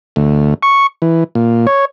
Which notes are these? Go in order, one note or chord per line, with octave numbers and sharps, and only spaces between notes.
D2
C#6
E3
A#2
C#5